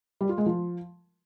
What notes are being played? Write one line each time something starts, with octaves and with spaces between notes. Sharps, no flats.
G3
F4
G#3
F3